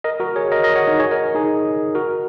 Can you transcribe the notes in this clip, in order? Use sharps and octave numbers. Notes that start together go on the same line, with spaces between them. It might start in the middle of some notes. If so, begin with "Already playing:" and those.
A#4 D#5
F#4 A#4
G#4 C#5
A#4 D#5
A#4 D#5
C#5 F#5
D#4
G#4 C#5
A#4 D#5
D#4 G#4
F#4 A#4